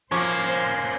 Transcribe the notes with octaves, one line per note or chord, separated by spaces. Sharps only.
F3 A#3 C#4 C5 C#6 D6